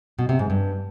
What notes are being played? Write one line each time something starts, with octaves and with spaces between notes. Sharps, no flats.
B2
C3
G#2
G2